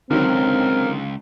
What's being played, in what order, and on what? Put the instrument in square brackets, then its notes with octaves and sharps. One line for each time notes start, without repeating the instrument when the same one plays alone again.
[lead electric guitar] C#2 [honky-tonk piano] D3 D#3 F#3 [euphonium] C4 [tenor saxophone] A#4